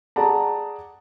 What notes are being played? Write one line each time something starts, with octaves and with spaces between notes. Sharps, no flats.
G#4 D5 F#5 A5 A#5